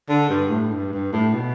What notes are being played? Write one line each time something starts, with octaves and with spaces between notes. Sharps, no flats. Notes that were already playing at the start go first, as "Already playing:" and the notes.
D3
G2
A2
G2
G2
A2
B2